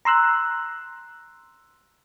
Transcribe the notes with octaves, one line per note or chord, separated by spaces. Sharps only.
A#5 C6 E6 F#6